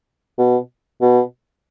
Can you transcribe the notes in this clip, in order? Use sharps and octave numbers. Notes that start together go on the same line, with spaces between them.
B2
B2